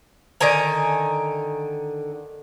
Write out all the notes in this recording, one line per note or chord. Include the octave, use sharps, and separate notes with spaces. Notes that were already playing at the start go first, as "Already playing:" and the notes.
D3 D#3 G#5 A#5